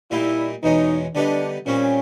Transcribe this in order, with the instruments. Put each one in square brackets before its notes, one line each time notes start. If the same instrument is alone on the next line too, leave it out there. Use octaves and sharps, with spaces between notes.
[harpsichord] A#2 G3 A#3 D#4 [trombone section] E4
[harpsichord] E2 B2 G#3 C#4 [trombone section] D#4
[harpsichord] D3 G3 B3 D#4 [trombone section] D4
[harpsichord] A#2 G3 C4 [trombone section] C#4